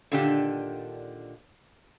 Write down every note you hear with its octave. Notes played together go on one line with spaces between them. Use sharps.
A#2 D3 D#3 D4 G4